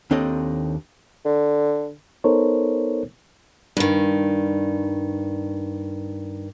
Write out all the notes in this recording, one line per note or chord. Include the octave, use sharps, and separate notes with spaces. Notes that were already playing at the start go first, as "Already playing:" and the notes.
D#2 C4 D4 A4 C#5 D#5
D3
B3 D#4 A4 A#4 C5 C#5
G2 D#3